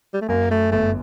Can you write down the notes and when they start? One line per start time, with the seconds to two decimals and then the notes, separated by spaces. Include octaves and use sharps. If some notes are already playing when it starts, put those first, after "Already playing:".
0.14 G3
0.21 A3
0.28 F#2 A#3
0.51 A3
0.72 G1 A3